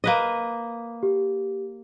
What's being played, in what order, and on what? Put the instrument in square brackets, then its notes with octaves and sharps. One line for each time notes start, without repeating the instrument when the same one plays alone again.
[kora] A#3 B4 D#5
[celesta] G4